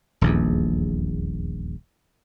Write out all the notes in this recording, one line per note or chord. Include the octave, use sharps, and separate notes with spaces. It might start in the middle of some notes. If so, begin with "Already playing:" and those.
D#1 A#1 E2